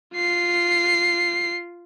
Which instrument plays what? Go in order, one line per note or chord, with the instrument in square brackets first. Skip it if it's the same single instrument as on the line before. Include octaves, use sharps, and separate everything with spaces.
[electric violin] F4 C7